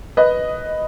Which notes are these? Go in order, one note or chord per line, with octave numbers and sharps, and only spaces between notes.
B4 D#5